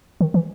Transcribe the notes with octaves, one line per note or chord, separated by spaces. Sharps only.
D#3
E3